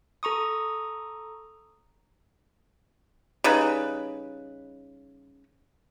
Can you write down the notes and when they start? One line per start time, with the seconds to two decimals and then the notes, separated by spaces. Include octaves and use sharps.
0.23 A4 A#5 C#6 D#6
3.44 C#3 G3 D#4 B4